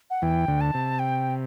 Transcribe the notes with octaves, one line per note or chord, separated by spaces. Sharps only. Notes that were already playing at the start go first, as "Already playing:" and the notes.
F#5
E2 E3 G5
D2 D3
A5
C3
G5